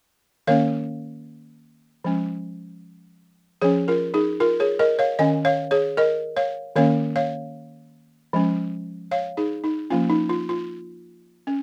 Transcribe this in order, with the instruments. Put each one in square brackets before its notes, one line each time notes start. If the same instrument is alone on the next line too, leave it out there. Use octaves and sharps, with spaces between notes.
[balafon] D#3 A#3 C#4 C#5 F5
F3 G#3 C#4
F3 C#4 G#4 C#5
F4 A#4
D#4 G#4
F4 A#4
G#4 C#5
A#4 D#5
C#5 F5
D#3 C#4 D#5 G#5
C#5 F5
G#4 C#5
A#4 D#5
C#5 F5
D#3 A#3 C#4 C#5 F5
C#5 F5
F3 G#3 C#4
C#5 F5
D#4 G#4
D#4
F3 A#3 C#4 F4
D#4
F4
F4
C#4